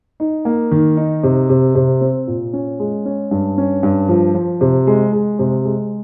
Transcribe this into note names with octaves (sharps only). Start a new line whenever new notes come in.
D#4
A#3
D#3
D#4
C3
C3
C3
C4
A#2
C#4
G#3
C#4
G2
C#4
G2
F3
F3
C3
G#3
G#3
C3
G#3